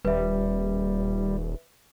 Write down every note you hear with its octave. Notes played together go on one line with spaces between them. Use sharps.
D#1 G3 B4 E5